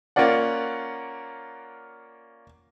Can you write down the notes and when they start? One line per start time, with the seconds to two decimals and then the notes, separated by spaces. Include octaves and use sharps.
0.16 A#3 C#4 F4 D5 F#5